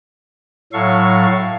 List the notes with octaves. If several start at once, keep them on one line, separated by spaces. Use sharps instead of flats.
A2 F#3 A4 F5 C#6